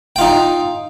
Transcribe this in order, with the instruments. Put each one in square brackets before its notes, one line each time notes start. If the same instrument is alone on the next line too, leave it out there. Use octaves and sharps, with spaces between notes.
[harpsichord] G5
F4
D#4